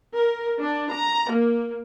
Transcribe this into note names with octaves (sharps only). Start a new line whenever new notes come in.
A#4
D4
A#5
A#3